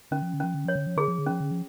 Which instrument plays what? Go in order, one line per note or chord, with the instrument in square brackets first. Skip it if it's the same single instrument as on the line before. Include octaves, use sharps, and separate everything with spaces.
[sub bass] D3 [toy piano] C#4
[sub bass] F3
D3
[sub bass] F3 [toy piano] C#4
[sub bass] D3
[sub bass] F3 [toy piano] C#5
[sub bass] D3
F3
[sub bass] D3 [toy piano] G#4
[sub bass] F3
D3
[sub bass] F3 [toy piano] C#4
[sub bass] D3
F3